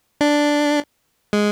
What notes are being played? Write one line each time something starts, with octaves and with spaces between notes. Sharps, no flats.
D4
G#3